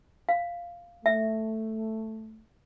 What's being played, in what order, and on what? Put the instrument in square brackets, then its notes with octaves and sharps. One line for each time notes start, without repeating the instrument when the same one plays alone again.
[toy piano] F5
[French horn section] A3 [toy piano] E5